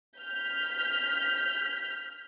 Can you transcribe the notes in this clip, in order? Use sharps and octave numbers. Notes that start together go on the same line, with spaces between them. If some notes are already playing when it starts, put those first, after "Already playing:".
F6 G6 B6